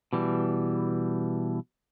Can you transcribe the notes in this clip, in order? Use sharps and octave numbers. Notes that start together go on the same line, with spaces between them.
B2 E3 G3